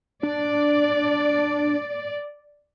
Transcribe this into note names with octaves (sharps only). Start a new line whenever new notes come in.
D4 D5